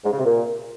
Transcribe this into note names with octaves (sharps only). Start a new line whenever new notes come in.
G#2
C#3
C3
A#2